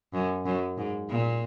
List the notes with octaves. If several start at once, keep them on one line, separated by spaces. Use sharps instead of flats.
F#2
F#2
G#2
A#2